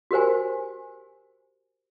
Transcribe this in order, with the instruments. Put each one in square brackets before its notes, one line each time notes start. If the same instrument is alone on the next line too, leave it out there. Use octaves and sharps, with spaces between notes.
[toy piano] F#4 G4 A#4 C5 G#5